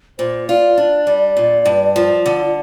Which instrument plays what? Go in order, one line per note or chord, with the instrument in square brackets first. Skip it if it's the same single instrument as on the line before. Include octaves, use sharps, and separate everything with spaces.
[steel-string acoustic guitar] A#2 [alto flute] C5
[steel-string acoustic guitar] F4 [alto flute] D5
[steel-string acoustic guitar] D4
G3
A#2
G2
F3
D3